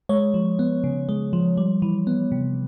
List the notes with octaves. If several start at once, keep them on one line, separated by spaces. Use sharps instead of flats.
G#3 C#5
F3
B3
C#3
G#3
F3
G3
E3
B3
C3